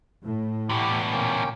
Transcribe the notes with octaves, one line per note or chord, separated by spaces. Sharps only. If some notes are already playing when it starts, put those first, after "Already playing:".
A2
E2 B2 G4 D6
A#2 C#3 A#3 C#4 G5